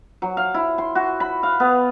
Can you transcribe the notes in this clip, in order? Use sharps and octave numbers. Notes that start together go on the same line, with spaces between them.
F#3
F5
E4
C6
F#4
B5
F5
B3